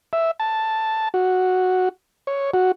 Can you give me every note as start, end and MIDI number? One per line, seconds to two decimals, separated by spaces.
0.13 0.31 76
0.40 1.09 81
1.14 1.89 66
2.27 2.51 73
2.54 2.72 66